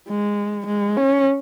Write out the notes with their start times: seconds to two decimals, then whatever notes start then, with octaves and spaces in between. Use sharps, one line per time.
0.08 G#3
0.67 G#3
0.97 C#4